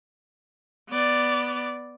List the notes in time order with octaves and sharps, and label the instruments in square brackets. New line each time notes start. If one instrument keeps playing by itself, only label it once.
[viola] B3 D5